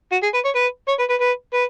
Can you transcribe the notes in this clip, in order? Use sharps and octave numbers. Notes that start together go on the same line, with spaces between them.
F#4
G#4
B4
C#5
B4
C#5
B4
B4
B4
B4